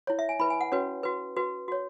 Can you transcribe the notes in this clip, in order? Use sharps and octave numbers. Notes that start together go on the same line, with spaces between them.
E4 C#5
E5
G#5
E4 B4 B5
G#5
F#5
C#4 F#4 B4 C#5
F#4 B4
F#4 B4
F#4 C#5